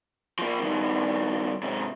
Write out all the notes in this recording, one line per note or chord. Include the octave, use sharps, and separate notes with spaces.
F3 A#3
G2 D#3
G#2 C3